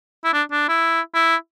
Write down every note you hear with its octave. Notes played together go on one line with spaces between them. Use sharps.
E4
D4
D4
E4
E4